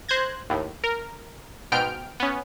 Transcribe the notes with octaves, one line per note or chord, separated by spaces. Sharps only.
C5 F#6 G#6 A#6
D#2 A2
A#4
G#2 B2 G5 F6 D7
B3 C#4